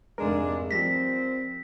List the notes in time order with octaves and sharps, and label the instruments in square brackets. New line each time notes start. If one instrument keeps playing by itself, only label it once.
[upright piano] F1 G#2 [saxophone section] G#3 D4 [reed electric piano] A#4
[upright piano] F3 G3 [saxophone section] C4 [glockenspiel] A#6 B6